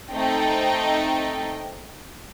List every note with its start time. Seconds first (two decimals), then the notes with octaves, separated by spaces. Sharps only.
0.11 A3 C4 D#4 A4 D#5 G5